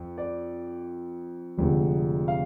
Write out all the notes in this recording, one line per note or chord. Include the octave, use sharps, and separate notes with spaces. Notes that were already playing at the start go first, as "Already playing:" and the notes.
Already playing: F2
D5
F1 F2 D3 G#3
F5